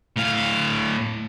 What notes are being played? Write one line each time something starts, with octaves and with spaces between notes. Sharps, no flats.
A2 F5